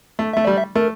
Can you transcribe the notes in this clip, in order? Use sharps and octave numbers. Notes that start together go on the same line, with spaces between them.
A3
A3 E5
G3 D5
E5
A3 A#4